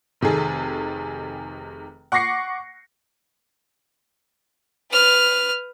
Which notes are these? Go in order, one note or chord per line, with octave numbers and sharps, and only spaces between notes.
F1 C3 D#3 G#4 A4
F#5 C#6 D6 A#6 C7 C#7
B4 F6